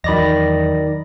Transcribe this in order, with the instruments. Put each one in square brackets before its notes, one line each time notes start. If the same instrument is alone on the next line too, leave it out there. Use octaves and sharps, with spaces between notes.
[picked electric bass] E2 F#3 [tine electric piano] D#3 D5 A#6 [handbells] D#5 B5